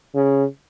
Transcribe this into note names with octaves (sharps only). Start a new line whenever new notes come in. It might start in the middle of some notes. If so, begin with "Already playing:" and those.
C#3